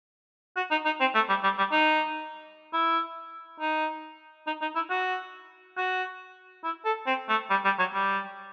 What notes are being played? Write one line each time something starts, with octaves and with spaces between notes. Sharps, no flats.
F#4
D#4
D#4
C4
A3
G3
G3
G3
D#4
E4
D#4
D#4
D#4
E4
F#4
F#4
E4
A4
C4
A3
G3
G3
F#3
G3